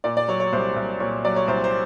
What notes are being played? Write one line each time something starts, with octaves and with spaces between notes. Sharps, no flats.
A#2 D5
D5
F#3 C#5
C#5
C2 C5
C2
A#2 C#5
F#3 D5
C#5
C2 C5
C5